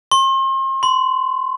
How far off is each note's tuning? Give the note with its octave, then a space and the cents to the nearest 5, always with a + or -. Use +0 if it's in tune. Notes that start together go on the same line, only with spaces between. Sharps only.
C6 +40
C6 -25